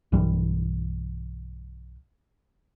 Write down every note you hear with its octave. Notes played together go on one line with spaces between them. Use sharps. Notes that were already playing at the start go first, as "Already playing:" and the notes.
B1 G2 E3 G3